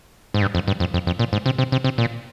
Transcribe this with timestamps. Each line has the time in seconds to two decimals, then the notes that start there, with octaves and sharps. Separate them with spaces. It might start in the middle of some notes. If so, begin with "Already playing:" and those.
0.34 G#2
0.42 G2
0.55 F2
0.68 G2
0.80 F2
0.94 F2
1.07 F2
1.19 A#2
1.33 G#2
1.46 C3
1.58 C3
1.72 C3
1.84 C3
1.98 A#2